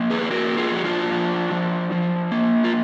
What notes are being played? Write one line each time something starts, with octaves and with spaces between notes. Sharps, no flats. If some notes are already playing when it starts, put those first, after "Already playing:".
Already playing: F3 A#3
G#4 B4
G#4
A#3 F#4 A#4
F4 G#4
F3 F#4
D4 F4
F3
F3
F3
A#3
F4